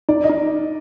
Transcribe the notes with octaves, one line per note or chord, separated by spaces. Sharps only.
D#4 D5
D#5
D#4